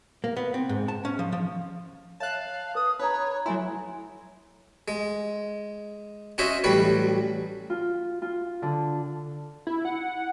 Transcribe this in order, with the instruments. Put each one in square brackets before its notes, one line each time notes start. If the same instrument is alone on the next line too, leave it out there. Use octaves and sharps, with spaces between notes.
[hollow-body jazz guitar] A#3
B3
C4
G#2
A5
C#4
F3
F3
[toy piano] C#5 E5 [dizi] F5 [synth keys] A5 F#6
[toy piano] B4 [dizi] D#6
[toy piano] D#4 A#5 [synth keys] B4 [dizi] C#5
[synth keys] F#3 A3 E4 [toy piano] E5 G#5 C6
[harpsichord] G#3
C#4 F#4 C5 C#5 D#5 E5
A1 F#3 G3 B4 C#5
[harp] F4
F4
D3
[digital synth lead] E4
F#5